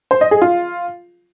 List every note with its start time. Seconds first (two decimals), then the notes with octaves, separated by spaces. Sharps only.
0.11 C5
0.21 D#5
0.31 G#4
0.42 F4